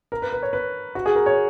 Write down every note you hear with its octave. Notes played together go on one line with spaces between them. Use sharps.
A#4
B4
B4
C#5
B4
F#4
G#4
A#4
C#5